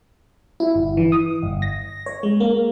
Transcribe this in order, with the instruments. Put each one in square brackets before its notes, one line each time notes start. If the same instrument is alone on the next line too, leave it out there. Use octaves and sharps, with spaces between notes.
[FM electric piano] E4
G1
E3
D#6
G1
A#6
C#5
G#3
A#3